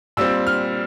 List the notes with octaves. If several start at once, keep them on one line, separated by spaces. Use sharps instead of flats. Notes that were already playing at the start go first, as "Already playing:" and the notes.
A#2 G3 C4 E6
F6